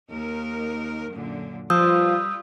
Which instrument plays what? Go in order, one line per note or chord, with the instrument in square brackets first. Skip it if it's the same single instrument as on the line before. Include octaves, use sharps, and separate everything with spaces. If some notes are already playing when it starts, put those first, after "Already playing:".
[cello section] D#2 D#4 A#4
F#2 A#2 D3
[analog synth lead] F3 [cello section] G3 F4 B4 [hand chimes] D#6 E6 G6